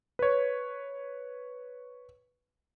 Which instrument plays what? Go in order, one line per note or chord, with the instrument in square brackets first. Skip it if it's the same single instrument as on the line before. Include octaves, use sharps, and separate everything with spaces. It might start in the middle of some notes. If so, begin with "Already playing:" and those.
[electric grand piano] B4 C#5